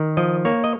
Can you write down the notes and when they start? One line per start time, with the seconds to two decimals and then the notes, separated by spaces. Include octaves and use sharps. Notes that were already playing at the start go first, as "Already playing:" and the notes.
Already playing: D#3
0.17 F3 D#5
0.45 A#3 C#5
0.64 D#5